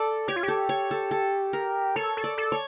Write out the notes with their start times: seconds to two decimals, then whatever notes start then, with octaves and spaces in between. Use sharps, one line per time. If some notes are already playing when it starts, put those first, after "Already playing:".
Already playing: A4 D5
0.28 G4 C#5
0.36 F4
0.43 G4
0.48 A4
0.69 C#5
0.91 A4
1.11 A4
1.53 A#4
1.96 A4 C#5
2.17 A4
2.24 D5
2.38 A4
2.52 C#5